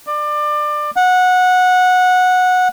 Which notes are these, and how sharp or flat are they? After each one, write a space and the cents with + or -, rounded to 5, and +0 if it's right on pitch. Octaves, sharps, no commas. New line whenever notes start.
D5 +25
F#5 -15